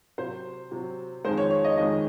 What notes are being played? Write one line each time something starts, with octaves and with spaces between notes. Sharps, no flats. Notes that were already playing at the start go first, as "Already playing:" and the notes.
C3 F#3 C5
C3 F#3
F2 D#3 G#3 C5
C#5
C#5
D#5
F2 D#3 G#3 D#5